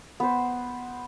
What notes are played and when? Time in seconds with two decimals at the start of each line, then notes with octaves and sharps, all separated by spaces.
0.20 B3 C5